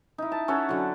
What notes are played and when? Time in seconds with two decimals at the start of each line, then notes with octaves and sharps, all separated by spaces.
0.18 D#4 E4
0.32 A5
0.48 C#4 A4 C#5 F#5
0.69 D3 F#3